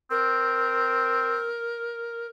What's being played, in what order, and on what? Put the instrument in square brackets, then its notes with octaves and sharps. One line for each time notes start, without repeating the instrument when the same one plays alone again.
[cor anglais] C4 [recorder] A#4